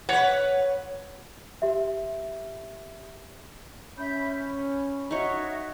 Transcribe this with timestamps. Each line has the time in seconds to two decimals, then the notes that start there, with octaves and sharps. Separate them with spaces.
0.09 B4 C#5 F#5
1.62 G4 E5
3.98 C#4 E5 B5 G6
4.47 B5
5.11 D#4 F#4 C#5 E5